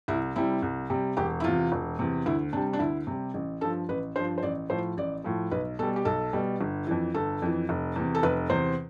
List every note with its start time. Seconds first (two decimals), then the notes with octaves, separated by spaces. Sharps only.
0.08 C2 E4
0.36 C3 G3 E4
0.62 C2
0.90 C3 G3
1.17 E1 G4
1.40 E4
1.44 E2 C3 F4
1.72 E1
1.99 E2 C3
2.26 D2 E4
2.53 C3 G3 D4
2.73 D4
2.79 D2 E4
3.07 C3 G3
3.34 A1
3.61 G2 A4
3.65 F3
3.89 A1 B4
4.16 G2 C5
4.19 F3
4.38 C5
4.43 A1 D5
4.70 A2 F3 C5
4.97 A1 D5
5.24 A2 F3
5.51 B1 B4
5.79 B2 A4
5.83 G3
5.96 G4
6.05 B1 A4
6.33 B2 G3
6.61 G1
6.87 F2 E3
7.14 G1 A4
7.42 F2 E3
7.69 F1
7.96 E2 C3
8.15 A4
8.23 F1 B4
8.50 E2 C3 C5